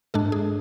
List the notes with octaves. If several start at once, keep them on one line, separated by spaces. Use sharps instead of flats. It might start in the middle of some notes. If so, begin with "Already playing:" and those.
G#2 G#3 D4 A4
G#4